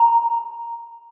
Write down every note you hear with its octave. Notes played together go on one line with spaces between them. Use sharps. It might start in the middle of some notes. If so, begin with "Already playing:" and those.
Already playing: A#5